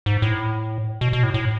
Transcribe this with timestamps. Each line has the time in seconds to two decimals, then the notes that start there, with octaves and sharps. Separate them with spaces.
0.06 G#2
0.22 A2
1.01 B2
1.13 B2
1.23 A2
1.34 A2